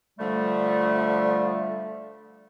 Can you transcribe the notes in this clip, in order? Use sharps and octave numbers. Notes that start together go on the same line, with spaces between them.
D3 F3 G3 A3